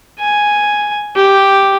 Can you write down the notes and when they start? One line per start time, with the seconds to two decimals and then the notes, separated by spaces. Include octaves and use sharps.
0.20 G#5
1.16 G4